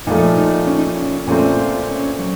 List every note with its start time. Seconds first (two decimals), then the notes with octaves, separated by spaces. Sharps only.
0.07 A#2 F3 A3 D#4
0.38 D#4
0.68 C#4
0.77 D#4
0.87 C#4
1.27 A#2 A3 C4 C#4
1.58 F4
1.89 C#4
2.19 F#3